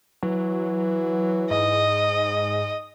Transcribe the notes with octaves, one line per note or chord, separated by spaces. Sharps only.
E3 F#3
G#2 D#5